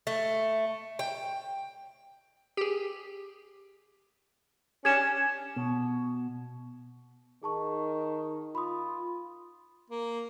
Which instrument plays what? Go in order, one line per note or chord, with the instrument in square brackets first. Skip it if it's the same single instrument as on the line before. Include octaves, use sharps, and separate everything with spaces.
[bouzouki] A3
G5
[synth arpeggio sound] G4 G#4
[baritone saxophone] C#4 [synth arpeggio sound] D4 G4 [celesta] G#6 E7
[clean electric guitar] B2
[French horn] D#3 [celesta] G#4 A5 C#6
[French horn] F4 [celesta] B5 C6 D#6
[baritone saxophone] A#3